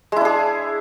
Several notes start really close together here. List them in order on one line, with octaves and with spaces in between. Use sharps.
G#3 E4 D4 G#4